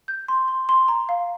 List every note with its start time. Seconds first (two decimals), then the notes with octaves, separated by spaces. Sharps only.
0.08 G6
0.28 C6
0.48 C6
0.69 C6
0.88 A#5
1.09 F5